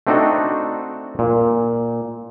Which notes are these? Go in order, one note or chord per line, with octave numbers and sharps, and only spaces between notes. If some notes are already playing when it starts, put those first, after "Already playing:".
A3 C4 D4 D#4 F#4 A4
A#2